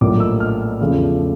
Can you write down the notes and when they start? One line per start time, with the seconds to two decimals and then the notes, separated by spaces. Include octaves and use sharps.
0.01 A#1 A2 F#3 A#3 D6
0.20 E6
0.40 F6
0.81 E2 C#3 F3 A3